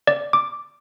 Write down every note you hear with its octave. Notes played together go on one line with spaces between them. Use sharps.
D5
D6